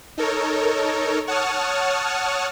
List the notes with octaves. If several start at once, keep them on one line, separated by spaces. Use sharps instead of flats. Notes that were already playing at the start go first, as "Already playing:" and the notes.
D#4 A4 A#4 C#5
C#5 F#5 A5 C#6 D#6 F6